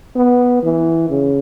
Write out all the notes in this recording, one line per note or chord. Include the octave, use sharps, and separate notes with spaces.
B3
E3
C#3